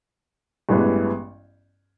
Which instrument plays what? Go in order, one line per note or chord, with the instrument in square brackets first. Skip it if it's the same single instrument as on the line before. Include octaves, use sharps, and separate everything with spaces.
[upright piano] A1 G2 E3 G#3 B3